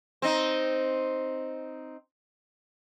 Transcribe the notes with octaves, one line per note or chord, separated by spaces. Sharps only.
C4 D#4